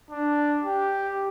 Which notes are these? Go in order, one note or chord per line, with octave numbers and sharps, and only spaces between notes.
D4
G4